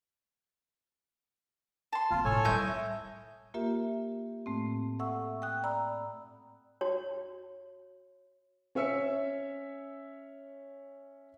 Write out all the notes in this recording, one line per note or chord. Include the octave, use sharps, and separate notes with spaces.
A5 C6
A#3 C4 F4
A2 A3 A4 C#5 G#5
G3 E4 D#5 G6
A#3 F4 G4 A#4 E5
A2 A3 C4
A4 E5 F#5 C#6 E6
G5 D#6 F#6
D5 A#5 B5 E6
F#4 C#5
C#4 C#5 E5 E6 C#7